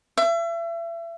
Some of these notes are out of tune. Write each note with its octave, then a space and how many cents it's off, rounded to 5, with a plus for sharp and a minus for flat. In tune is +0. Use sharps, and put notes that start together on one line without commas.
E5 +35